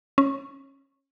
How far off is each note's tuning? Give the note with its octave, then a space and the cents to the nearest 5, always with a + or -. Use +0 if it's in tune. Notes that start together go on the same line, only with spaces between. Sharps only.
C#4 -20